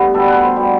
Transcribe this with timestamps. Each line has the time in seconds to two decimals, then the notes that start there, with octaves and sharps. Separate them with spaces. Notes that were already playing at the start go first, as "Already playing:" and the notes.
Already playing: G2 A3 B3
0.14 B2 G3 A4
0.28 B4
0.43 C5
0.56 B2 G3